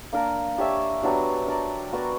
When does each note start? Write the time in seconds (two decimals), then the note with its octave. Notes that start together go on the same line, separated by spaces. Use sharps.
0.12 A#3 D4 A#4
0.58 D4 G4 C#5 E5
1.03 F#3 B3 D4 G4
1.47 D4 A#4 D5
1.92 B3 F#4 A#4 D5